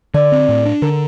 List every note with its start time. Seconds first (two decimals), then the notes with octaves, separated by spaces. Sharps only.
0.14 D3 D5
0.32 C4
0.49 A2
0.65 D4
0.82 D3 A#4